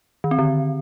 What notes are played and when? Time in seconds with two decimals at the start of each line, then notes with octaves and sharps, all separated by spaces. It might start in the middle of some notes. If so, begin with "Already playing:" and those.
0.24 D#3
0.31 C4
0.39 D3